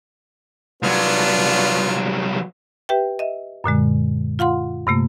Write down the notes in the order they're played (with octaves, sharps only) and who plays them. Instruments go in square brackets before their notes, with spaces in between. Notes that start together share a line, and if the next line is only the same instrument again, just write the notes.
[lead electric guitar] C2 F#3 [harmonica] B3 D4 F4
[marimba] G4 B4 E5 G5
D#5 E5
F#2 A#2 D3 G#3
F4 F5 F#5 C6
G2 C3 A3 A#3